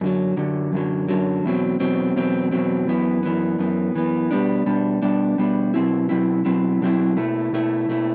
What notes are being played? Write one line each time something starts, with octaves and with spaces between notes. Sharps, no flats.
F#2 D3 F#3
F#2 D3 F#3
F#2 D3 F#3
F#2 D3 F#3
E2 B2 F#3 C4
E2 B2 F#3 C4
E2 B2 F#3 C4
E2 B2 F#3 C4
F#2 E3 B3
F#2 E3 B3
F#2 E3 B3
F#2 E3 B3
B2 G3 B3 D4
B2 G3 B3 D4
B2 G3 B3 D4
B2 G3 B3 D4
B2 F#3 C4 E4
B2 F#3 C4 E4
B2 F#3 C4 E4
B2 F#3 C4 E4
B2 A3 E4
B2 A3 E4
B2 A3 E4